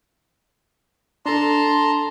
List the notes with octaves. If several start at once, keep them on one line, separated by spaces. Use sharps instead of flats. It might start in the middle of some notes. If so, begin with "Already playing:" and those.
D4 A4 A5 A#5 C6